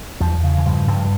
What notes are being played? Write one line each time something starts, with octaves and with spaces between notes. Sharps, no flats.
E2 F3
C#3
E3
G2 F3
G2